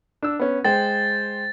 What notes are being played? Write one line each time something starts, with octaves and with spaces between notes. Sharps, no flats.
D4 E6
B3 C#4
G#3 C5 G5 A6